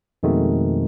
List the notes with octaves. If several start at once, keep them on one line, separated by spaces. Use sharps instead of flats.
F2 B2 D#3 G#3 A3